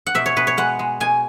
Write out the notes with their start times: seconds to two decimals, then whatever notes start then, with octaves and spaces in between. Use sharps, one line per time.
0.06 F#5
0.15 B2 E5
0.26 C#5
0.36 B2 B4
0.47 C#5
0.57 G#3 F#5
0.79 G#3
1.00 B2 G#5